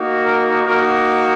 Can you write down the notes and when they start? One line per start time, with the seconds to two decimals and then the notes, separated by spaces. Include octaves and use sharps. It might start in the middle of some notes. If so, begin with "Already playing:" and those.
Already playing: A#3 D#4 F#4
0.25 A#4
0.66 A#3 D#4 F#4 A#4